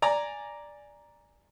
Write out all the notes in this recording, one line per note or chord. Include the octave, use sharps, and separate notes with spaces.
D5 G#5 A#5